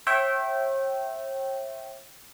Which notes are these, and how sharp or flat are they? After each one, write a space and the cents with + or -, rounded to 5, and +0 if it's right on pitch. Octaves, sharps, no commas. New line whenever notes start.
C#5 -45 E5 +0 G5 -20